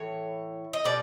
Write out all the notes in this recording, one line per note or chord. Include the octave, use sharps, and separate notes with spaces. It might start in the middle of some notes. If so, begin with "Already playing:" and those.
Already playing: A2 E3 C#5
D#5
B2 G3 D5